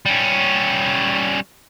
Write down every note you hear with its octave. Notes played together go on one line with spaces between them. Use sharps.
G3 C#4